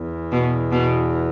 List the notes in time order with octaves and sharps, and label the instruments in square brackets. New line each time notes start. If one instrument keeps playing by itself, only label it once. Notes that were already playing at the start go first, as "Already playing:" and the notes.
Already playing: [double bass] E2
[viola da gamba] B2
B2